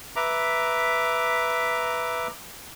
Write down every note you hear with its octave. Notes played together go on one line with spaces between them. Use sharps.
B4 E5 A#5 D6